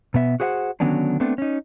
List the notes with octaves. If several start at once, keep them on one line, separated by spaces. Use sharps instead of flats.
B2 B3 E5
F#4 G#4 C5 E5 F#5
D3 D#3 F#3 B3 C#4 D4
A3 B3 C4 D4
C#4 D#4